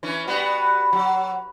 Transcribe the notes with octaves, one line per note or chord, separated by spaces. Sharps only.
E3 C#4
G3 B3 F#4
F#3